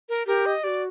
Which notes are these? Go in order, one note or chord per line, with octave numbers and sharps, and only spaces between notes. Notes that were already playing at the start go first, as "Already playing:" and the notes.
A#4
G4 A#4
D#5
F#4 G4 D5